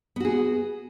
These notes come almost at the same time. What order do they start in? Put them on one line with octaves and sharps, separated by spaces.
B3 F#4 G#4